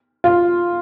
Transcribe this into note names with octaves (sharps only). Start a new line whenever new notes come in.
F4